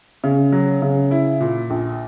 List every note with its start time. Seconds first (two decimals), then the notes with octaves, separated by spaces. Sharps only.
0.24 C#3
0.52 F#3
0.82 C#3
1.11 E4
1.40 A#2
1.70 A#1